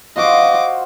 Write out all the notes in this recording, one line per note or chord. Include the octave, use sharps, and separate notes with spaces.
F4 F#4 C5 D#5 D6